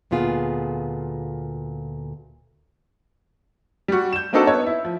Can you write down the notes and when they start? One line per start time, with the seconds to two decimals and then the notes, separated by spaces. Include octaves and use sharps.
0.11 D2 A#2 B3 F4 G#4
3.88 G3 F#4
4.13 G6 E7
4.33 A#3 C4 D4 D#4 F#4 A4
4.47 B3 C#5
4.66 E4
4.85 F3